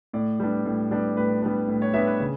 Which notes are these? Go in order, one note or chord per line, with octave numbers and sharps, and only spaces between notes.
A2 D5
G3 B3 D4
A2
G3 B3 D4
A2 B4
G3 B3 D4
A2
C#5
G3 B3 D4 E5
B4
C#3